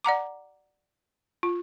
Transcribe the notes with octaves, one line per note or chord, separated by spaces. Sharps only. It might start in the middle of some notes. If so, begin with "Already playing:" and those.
D5 F#5 A#5 D6
F4